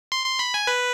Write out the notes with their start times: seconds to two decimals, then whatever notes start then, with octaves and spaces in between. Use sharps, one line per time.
0.12 C6
0.25 C6
0.39 B5
0.54 G#5
0.67 B4